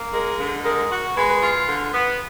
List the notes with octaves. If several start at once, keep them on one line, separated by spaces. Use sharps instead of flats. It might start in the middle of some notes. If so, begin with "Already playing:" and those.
Already playing: A#3
G#3 A#4
D3
G#3 A#4
F#4
G#3 B4
F4
D3
B3